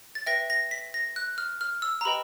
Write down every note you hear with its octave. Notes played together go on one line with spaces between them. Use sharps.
A6
B4 E5 G5 A#6
A#6
B6
A#6
F#6
F6
F6
E6
A#5
G4 B4 D#5 G5 B5